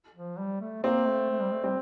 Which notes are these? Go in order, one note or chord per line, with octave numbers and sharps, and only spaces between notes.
F3
G3
A3
A#3 C4
A3
A3
G3
A3
G3 C4